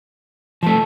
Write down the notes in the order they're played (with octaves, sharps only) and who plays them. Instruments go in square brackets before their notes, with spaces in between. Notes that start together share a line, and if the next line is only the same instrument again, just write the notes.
[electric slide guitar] F3 A3 [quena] A5